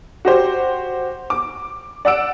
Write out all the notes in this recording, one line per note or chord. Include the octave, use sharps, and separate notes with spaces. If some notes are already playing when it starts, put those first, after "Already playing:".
F#4 G4 C5
D6
D5 F#5 E6 D7